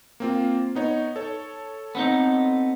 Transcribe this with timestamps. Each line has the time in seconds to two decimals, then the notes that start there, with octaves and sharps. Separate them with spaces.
0.20 A#3 C4 F4
0.75 B3 D#4 C#5
1.16 A4 C#5
1.95 B3 C4 D#4